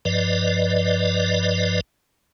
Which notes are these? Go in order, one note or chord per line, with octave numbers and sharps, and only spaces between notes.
G2 F3 B4 D5 D#5